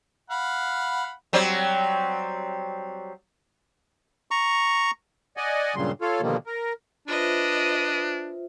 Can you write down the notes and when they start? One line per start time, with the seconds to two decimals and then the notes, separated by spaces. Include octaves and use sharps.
0.30 F5 F#5 B5
1.33 F#3 G3 C4
4.31 A#5 C#6
5.37 D5 D#5 F#5 G#5
5.76 G2 A#2 C#3 F#3 G3 C6
6.01 F4 A4 C#5 F5
6.21 B2 D3 D#3 F3 G3 A#3
6.47 A#4
7.08 D4 F4 B4 C5 D#5 E5